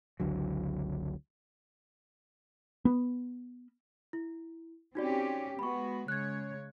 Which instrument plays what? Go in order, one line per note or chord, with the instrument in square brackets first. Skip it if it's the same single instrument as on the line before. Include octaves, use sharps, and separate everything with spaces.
[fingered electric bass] F#1 C#2 D3 F#3
[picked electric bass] B3
[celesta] E4
[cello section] C4 C#4 G4 [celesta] D#4 F#4 D5
[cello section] G#3 B3 F#4 [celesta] B5 C#6
[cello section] C#3 G#3 C#5 [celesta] F#6 G#6